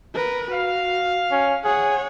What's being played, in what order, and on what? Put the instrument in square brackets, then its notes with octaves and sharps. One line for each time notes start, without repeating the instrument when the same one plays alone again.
[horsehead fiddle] A#4 B4
[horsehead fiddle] F#4 [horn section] F5
[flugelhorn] C#4
[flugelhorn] G#4 [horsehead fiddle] C#5 F#5